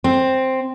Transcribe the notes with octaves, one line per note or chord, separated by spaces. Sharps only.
C4